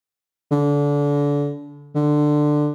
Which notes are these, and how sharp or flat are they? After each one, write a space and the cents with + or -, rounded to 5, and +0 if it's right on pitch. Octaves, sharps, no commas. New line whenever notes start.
D3 -25
D3 +15